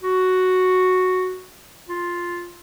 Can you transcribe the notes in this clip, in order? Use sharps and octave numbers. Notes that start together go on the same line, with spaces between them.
F#4
F4